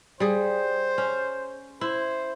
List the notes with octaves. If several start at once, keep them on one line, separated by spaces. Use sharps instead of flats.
G3 G#4 C5
C#4
E4 C5